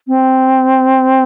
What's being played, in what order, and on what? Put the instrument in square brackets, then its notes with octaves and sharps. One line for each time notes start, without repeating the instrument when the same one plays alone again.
[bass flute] C4